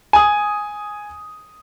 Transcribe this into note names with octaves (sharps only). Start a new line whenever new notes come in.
G#5 D#6